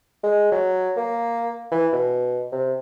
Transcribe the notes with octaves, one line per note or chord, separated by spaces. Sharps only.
G#3
F#3
A#3
E3
B2
C3